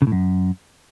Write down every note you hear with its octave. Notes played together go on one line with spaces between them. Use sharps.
C#3
A2
F#2